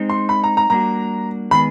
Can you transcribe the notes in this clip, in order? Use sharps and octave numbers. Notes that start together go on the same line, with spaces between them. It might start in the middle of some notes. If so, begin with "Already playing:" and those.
Already playing: G#3 C4 D#4
C6
B5
A#5
A#5
G3 A#3 D4 F#4 A#5
D#3 G#3 B3 B5